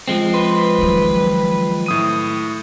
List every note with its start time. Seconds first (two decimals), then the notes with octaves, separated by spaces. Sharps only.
0.08 F3 G#3 C4
0.34 B4 C6
0.78 D#3 F#3
1.86 A2 D#6 D#7